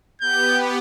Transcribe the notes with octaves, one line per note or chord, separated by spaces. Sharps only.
B3 G4 G6